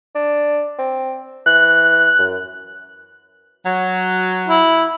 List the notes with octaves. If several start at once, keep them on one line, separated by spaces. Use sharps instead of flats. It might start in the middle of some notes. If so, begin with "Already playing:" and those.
D4
C4
E3 F#6
F#2
F#3
E4